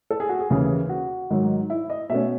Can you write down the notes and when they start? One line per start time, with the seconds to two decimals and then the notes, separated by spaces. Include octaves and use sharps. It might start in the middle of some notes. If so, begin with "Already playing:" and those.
0.11 A4
0.20 G#4
0.29 F#4
0.39 G#4
0.50 D#2 C#3 E3
0.89 F#4
1.30 G#2 D#3 F#3
1.70 E4
1.90 D#5
2.10 B2 A3 C#4 E5